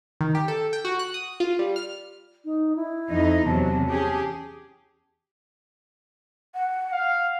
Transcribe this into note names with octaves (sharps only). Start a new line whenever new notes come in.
D#3
G4
A4
G5
F#4
F#6
D#6
F4
G3
F6
D#4
E4
F2 D#4
E2 C3 F#3 A5
C#4 G4 G#4
F#5
F5